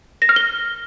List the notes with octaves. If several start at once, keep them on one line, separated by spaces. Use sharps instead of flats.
A#6
F6
G7